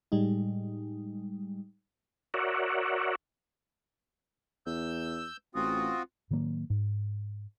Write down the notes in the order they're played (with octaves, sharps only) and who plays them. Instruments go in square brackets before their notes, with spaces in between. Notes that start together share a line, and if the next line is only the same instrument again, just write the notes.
[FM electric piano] A2 G3 G#3 D#4
[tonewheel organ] F#4 A#4 C#5 D5 E5 F#5
[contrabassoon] E2 [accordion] E6 G6
[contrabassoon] A1 [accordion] C4 F4 F#4 [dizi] D#6
[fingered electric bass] A2 D#3 F#3 A#3
G#2